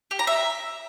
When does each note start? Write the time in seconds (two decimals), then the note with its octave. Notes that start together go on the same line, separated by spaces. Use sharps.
0.11 G4
0.19 A#5
0.27 E5